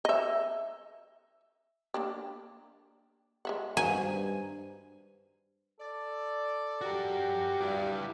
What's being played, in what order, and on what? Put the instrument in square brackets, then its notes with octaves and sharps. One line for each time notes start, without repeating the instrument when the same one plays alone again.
[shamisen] D#5 E5
A#3 D4 G4
G#3 E5 F#5
[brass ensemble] G2 C5 [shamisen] D#3 F#4 A#4 [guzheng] G#5
[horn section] A4 D5
[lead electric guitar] F#4 A#4 [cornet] G4
[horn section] G2 [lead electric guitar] E4 D5